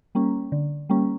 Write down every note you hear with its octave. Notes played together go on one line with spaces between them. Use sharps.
G3 A#3 C#4
D3
G3 A#3 C#4